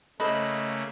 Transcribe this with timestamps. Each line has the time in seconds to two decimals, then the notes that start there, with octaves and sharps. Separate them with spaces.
0.20 C#3 A3 A#3 A4 B4 C5 D#5 B5